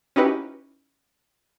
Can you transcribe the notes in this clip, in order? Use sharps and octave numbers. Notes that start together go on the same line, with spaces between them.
C#4 D#4 E4 F#4 G4 B4